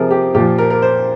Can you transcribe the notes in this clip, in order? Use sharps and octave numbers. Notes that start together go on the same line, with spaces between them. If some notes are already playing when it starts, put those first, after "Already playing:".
Already playing: C3 F3 G#4 A#4
G4
A#2 F3 G4
A#4
A#4
C5